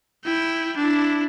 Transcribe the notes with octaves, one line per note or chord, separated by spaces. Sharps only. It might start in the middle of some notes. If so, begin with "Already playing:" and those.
E4 G5
D4 E4